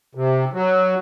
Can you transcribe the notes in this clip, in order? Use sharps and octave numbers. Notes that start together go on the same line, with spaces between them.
C3
F#3